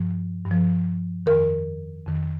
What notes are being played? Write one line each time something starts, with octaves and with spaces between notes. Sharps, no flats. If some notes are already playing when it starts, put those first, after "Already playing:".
Already playing: G2 F3
G2
F3
F2 D#3 A#4
F2 D#3